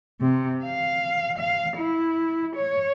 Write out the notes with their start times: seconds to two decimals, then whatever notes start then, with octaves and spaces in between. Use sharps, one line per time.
0.21 C3
0.65 F5
1.38 F5
1.77 E4
2.56 C#5